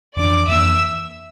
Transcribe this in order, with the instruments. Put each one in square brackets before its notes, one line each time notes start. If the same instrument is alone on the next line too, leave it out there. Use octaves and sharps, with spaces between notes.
[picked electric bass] F2 E3 A#3 D4 [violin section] D5 D6
[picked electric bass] F2 E3 A#3 D4 [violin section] E5 E6